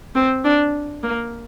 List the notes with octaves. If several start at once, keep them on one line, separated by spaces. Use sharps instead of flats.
C4
D4
A#3